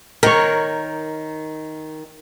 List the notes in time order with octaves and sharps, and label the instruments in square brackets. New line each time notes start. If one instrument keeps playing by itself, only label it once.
[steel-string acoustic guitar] D#3 [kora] A#4 C#5